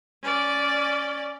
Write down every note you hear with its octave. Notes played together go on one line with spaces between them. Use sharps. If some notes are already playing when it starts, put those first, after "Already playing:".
C#4 D5